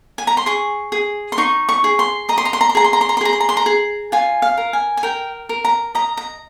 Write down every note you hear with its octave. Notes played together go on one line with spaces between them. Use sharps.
G#5
A#5
C6
G#4 C#6
G#4
C6
D#4 C#6
C#6
G#4
C6
D#5 A#5
C6
A#5
C6
A#5
C6
G#4 A#5
C6
A#5
C6
A#5
C6
G#4 A#5
C6
A#5
C6
A#5
G#4
F4 G#5
F5
A#4
G#5
G#5
A#4 G5
A#4
A#5
D#5 A#5
A#5